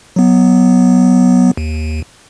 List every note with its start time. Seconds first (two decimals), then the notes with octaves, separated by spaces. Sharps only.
0.16 F#3 B3
1.57 D#2